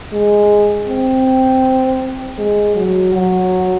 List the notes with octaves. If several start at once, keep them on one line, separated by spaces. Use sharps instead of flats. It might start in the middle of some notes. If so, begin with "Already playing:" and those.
G#3
C4
G#3
F#3
F#3